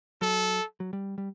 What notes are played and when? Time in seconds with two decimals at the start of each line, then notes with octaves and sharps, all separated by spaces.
0.21 F#3 A4
0.80 F#3
0.93 G3
1.18 G3